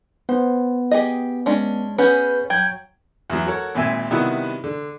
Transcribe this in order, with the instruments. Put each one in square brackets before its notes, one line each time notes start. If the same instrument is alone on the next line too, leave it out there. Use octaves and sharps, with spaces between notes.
[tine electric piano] B3 [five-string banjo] C5
[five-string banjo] G4 G#4 D#5
G#3 C#4 D4
[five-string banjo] B3 C#4 G#4 [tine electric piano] B4 G6
[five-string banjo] F#3 [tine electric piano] G5 G6 G#6
[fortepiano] E2 F#3
F#4 A4 A#4 C#5
G#1 A#2 C4 E5 G#5
C3 D#3 G3 B3 E4 F#4
D3